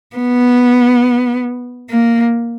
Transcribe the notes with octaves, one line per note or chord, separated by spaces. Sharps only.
B3
A#3